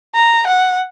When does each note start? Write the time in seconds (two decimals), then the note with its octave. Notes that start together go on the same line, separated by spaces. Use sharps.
0.15 A#5
0.47 F#5